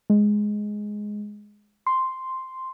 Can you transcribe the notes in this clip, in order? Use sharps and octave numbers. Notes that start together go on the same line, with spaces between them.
G#3
C6